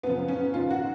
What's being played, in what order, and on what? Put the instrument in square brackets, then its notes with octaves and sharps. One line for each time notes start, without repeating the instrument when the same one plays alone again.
[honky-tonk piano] F#2 B3
C#3 F3
C#4
G#2 D#3 F4
F#4